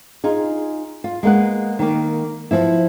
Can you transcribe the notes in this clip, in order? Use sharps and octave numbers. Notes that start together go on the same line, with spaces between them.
D#4 F4 G#4
F4
G#3 A#3 B3 F#5
D#3 A#3
F3 B3 E4